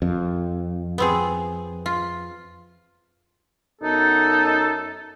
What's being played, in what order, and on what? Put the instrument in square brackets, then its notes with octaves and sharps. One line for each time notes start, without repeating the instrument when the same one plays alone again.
[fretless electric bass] F2
[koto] B3 C4 G#4
F4
[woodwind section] F#2 B3 A4 [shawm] D#4